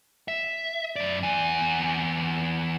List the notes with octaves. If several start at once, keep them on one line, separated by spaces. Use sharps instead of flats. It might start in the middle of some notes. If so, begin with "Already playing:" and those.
E5
F#2 D5
E2 G#5